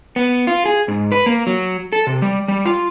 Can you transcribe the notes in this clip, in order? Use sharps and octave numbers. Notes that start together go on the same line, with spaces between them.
B3
F4
G#4
G#2
B4
A#3
F#3
A4
C3
G3
G3
F4